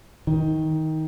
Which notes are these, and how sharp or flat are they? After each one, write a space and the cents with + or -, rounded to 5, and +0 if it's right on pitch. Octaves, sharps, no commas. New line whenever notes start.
D#3 +15